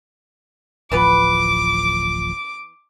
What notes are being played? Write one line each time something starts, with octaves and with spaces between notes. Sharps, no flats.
D1 A1 E3 F3 B3 B4 D6